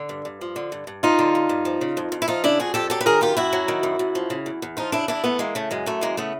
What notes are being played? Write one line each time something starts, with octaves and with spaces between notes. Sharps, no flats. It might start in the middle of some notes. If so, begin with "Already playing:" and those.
Already playing: D3
G2
G2
F3
D3
G2
G2
F3 D#4 F4
D3
G2
G2
F3
C#3
F2
F2
E4
F3 D#4 F4
C#3 D4 E4
F2 F#4 G#4
F2 G4 A4
F#3 G4 A4
B4
D#3 G#4 A#4
F#2 F4 G4
F#2 E4 F#4
F#3
D#3
F#2
F#2
F3
C#3
E2
E2
F3 D#4 F4
C#3 D4 E4
E2 D4 E4
E2 A3 B3
E3 G#3 A#3
C#3 A3
F#2 G#3
F#2 A3
E3 G#3 A#3
C#3 A3 B3